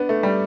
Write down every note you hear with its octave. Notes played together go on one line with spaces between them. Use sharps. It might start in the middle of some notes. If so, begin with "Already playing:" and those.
Already playing: B3 D4
A3
G3